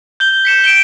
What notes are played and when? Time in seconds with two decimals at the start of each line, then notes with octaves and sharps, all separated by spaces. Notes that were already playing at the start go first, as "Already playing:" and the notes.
0.20 G6 G7
0.45 B6 C#7 E7
0.64 D7 E7 G7